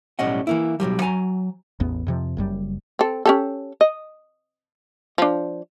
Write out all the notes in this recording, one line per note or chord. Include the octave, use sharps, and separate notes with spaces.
B1 A2 G3 C#4 D#5 F#5
E3 A#3 E4
B1 E2 F#3 G3
F#3 G#5 A#5
A1 E2 B3
F2 C3 F3
F#1 F#2 G3
C4 A4
C#4 G4 A4
D#5
F3 D4